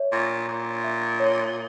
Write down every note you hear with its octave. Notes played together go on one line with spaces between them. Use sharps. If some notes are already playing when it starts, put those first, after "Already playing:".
Already playing: C#5 E5
A#2 C#6
A#2 A#5
E5
C#5